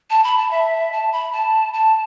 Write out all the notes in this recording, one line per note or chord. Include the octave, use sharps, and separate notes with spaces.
A5
B5
A5
E5
A5
B5
A5
A5